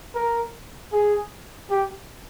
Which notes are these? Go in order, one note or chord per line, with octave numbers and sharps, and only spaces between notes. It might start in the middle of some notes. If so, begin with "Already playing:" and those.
A#4
G#4
G4